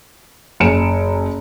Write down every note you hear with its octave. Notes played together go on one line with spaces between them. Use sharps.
F#1 G#5 C#7 D7 E7